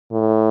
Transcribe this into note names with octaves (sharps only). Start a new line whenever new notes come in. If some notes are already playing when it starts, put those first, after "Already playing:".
A2